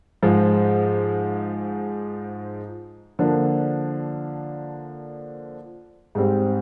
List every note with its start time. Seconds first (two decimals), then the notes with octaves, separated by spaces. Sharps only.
0.23 G#2 F3 G#3
3.19 D3 F3 A#3 D4
6.15 G#2 G3 C4